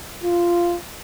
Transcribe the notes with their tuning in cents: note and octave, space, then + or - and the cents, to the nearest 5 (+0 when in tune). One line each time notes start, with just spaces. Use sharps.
F4 -10